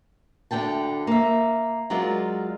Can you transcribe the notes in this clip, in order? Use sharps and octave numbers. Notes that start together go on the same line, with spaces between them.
D2 G#2 D3 G5 A5
A#3 E5
F#3 G#3 F4 A#4 D5